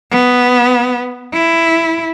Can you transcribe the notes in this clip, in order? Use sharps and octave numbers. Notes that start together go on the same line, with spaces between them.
B3
E4